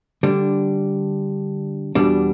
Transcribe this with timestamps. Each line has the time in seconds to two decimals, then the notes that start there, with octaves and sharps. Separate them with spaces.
0.23 D3 G3 D4
1.95 E2 B2 G3 D4